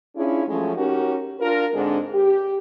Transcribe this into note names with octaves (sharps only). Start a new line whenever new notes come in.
C#4 D4 E4 F4 G#4
F3 F#3 G#3 A3 C#4
C#4 D#4 F#4 G4 A#4
D4 F4 A#4
G#2 D3 G#3 C4 D4
G4